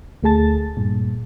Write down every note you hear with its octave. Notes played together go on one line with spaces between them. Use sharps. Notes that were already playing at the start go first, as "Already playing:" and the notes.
D2 A3 G#4 A5 A6
G2 A#2